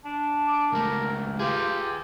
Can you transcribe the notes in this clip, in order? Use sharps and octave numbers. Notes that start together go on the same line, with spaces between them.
D4
D6
C#2 A3 A#4
F4 G4 G#4 B4